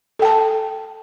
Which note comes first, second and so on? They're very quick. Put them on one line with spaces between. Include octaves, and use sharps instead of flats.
A4 G5 A5